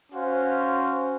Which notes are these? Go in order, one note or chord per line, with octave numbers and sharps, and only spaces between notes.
C#4 F#4 C5 F5